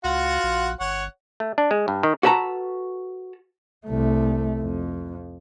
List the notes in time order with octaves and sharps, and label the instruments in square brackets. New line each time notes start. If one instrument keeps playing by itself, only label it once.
[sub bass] C#2 [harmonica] F4 F#4 F#5
[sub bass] A#1
[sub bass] G1 [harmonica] C#5 F#5
[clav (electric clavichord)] A3
D4
G#3
G2
D#3
[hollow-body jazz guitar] F#4 A4 B4 A5 A#5
[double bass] C2 A3
F2